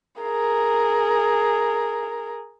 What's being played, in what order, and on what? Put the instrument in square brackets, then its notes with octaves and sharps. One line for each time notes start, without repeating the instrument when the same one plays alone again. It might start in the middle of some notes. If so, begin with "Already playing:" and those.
[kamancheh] G#4 A#4